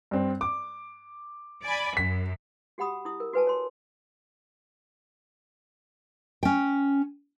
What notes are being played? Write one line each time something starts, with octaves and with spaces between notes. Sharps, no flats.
G2 C4
D6
D5 G#5 B5
F#2 B6
F#4 G4 F#5 B5 D#6
E4 D#6
A#4
F#4 B4 G#5 A5
C#5 C6
C#4 G5